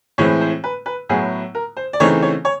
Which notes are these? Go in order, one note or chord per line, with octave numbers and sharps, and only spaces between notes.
A2 E3 G#3 C4 E4 C#5
C5
B4
B4
A2 F#3 B3 E4 G#4
A#4
C5
D5
C#3 E3 A3 C4 D#4 C#5
C#5
C#5